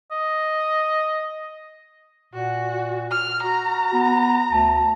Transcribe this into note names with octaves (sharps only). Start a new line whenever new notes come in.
D#5
A#2 F#4
F6
F#4 A#5
B3
D2 A5